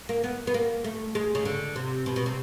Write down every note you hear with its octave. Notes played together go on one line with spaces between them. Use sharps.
A#3
B3
B3
A#3
A3
G#3
C#3
D3
C3
B2
B2
C3